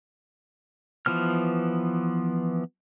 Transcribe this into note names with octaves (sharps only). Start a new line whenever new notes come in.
E3 F3 B3 F6